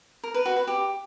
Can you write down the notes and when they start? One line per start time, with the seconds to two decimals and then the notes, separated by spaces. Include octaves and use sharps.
0.23 A#4
0.34 B4
0.45 F#4
0.56 B4
0.67 G4